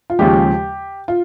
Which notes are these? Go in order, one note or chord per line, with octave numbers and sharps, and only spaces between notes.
F4
D#2 C#3 F3 G#3 G4
F4